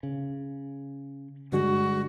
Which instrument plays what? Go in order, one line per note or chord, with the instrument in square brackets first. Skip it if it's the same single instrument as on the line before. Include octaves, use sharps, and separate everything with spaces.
[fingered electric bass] C#3
[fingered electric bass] G2 D3 G#3 [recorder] F#4